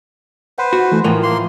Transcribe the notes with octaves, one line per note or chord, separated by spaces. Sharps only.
B4 C5 F#5
F#4
E3 A3
A2 E3 F3 A#4
A#3 C6